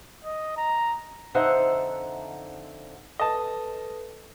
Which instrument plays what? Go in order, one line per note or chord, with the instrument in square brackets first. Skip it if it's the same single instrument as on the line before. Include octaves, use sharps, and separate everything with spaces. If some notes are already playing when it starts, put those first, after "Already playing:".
[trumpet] D#5
A#5
[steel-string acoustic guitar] F2 D3 D#4 C5 E5 F#5
[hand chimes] A4 B4 [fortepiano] D#5 A5